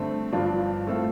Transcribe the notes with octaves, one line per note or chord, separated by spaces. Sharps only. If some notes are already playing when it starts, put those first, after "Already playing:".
Already playing: G2 D3 A3 C4 C5
G1 G2 F3 D4 F4
A2 A3 C4 F4 A4